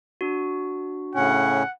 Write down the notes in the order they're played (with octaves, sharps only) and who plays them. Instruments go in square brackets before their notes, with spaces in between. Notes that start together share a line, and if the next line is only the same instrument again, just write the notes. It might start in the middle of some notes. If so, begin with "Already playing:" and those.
[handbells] D4 F#4
[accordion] A2 C#3 C#4 [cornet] F#5